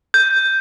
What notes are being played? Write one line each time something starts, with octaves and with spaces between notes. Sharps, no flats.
G6